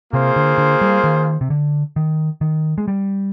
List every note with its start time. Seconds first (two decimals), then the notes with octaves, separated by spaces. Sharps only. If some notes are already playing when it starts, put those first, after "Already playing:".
0.13 C3 A#3 F4 G#4 C5
0.36 D3
0.58 D3
0.81 G3
1.04 D#3
1.41 C3
1.50 D3
1.96 D#3
2.41 D#3
2.78 G#3
2.88 G3